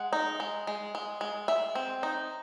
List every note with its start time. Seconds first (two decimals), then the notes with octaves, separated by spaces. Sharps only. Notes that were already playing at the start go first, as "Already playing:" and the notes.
Already playing: G#3 F#5
0.13 D#4
0.40 G#3
0.67 G#3
0.95 G#3
1.21 G#3
1.48 G#3 E5
1.75 C4
2.03 D#4